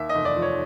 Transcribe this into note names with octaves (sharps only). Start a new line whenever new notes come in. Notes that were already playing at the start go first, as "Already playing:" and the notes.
Already playing: D#2 E5
D#5
F1
D5
F3
C#5